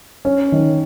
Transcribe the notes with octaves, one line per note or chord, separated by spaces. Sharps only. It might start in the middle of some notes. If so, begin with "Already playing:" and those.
C#4
D#3